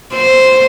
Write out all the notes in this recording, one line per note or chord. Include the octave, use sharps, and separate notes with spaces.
C5